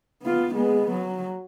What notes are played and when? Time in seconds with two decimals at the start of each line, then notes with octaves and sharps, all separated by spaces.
0.23 B3 F4
0.54 G#3 B3
0.91 F#3